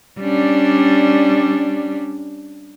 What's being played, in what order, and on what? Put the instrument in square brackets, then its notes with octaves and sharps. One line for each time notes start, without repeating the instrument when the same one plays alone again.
[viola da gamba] G3 C#4 D4